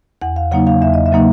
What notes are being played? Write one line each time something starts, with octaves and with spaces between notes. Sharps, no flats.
E2 F#5
F5
C#3 F#3 A#3 D#4 F#5
F5
E2 E5
D#5
E5
C#3 F#3 A#3 D#4